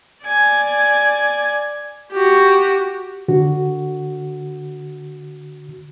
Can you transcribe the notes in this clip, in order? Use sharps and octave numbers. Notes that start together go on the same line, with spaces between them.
D5 G#5
F#4 G4
D3 F#4